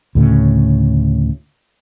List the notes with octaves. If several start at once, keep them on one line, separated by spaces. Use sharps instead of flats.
D2 A2 C#3